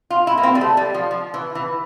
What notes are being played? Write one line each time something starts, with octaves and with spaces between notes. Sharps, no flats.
F4
E4
A#3
C4
G3
A3
G3
F3
F3
E3
E3